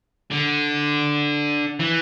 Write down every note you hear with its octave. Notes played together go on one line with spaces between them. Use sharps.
D3
E3